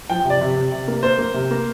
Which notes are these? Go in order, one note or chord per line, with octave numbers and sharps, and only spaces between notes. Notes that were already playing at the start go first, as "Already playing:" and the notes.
F3 G5
C3
D5
C3
C3
C3
A#3
A#3 C5
A#3
C3
A#3